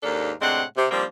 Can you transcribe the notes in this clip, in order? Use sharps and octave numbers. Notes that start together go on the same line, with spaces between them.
D#2 G#2 A#3 D4 A4 F5
A2 C3 G#3 C4 D4 F#5
C3
D#3 F3 G3 A#3 C4 D4